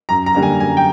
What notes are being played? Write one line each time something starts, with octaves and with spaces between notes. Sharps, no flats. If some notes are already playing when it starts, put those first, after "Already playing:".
F#2 A#5
A#5
D3 G3 A#3
G#5
F#2 G#5
G5